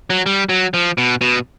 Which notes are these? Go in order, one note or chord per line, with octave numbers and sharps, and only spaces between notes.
F#3
G3
F#3
F3
B2
B2